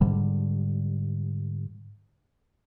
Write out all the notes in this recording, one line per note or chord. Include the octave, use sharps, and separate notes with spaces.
G#2 D3 G3